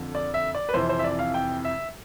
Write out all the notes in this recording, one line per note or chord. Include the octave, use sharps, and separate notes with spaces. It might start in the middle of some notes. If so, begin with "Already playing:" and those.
Already playing: F2 D3
D5
E5
D5
B4
F2 C3 E3 C5
C5
E5
D5
F5
G5
E5